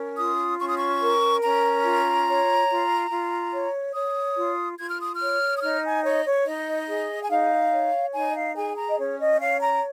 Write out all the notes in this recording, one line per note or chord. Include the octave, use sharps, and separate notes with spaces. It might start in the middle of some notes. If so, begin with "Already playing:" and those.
Already playing: C#4 A#4
F4 D#6
C#4 C#6
D#6
C#6
A#4
C#4 A#5
F4
C#5
F4
F4
C#5
C#5 D#6
F4
F4 G#6
F6
D#6
F6
C#5
D#6
D#4 F6
G#5
C#5 D#5
C#5
D#4 D#5
G#4
G#5
D#4 F5
C#5
D#4 G#5
D#5
F5
G#4 G#5
A#5
D#5
C#4 C#5
D#5
C#5 F5
A#5